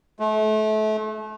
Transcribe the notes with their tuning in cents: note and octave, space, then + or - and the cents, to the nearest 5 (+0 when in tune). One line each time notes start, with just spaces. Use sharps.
A3 -30